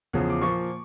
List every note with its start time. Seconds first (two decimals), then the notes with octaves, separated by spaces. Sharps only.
0.13 E2 C#3 F3
0.30 D6
0.42 A#2 F3 A#3 C#6